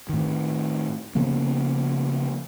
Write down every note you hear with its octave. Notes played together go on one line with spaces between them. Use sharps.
A2 D#3
C#3 F3 A#3 B3